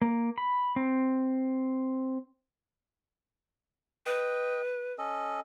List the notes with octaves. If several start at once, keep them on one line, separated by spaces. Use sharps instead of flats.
A#3
B5
C4
B4 D#5 G5
C#4 A4 D#5